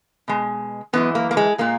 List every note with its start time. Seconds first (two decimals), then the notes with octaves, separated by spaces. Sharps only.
0.28 B2 G#3
0.93 F#2 E3 G#3 B3
1.15 A#3
1.31 A#3
1.37 G#3
1.58 A#2 G#3 A#3